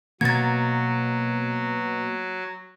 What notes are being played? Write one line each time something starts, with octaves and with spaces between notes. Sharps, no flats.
B2 F#3 A#3 F#5 A#5 G#6 A6